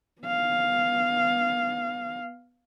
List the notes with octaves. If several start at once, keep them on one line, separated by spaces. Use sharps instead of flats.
B3 F5